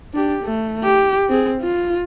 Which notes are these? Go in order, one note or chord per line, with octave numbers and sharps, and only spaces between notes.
D4 G4
A3
G4
C4 G#4
F4